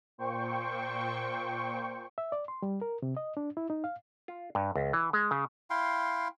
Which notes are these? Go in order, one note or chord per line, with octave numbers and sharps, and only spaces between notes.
A#2 C5 G5 C#6
E5
D5
C6
G3
A#4
C3
D#5
D4
E4
D#4
F5
F4
G2
C#2
E3
G#3
C#3
E4 F5 G5 C6